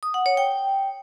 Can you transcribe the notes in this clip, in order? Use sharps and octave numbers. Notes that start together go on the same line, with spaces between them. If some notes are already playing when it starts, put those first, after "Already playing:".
D#6
F#5
C#5
G5